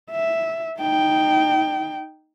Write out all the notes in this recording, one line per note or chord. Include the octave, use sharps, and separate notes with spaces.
E5
D#4 G5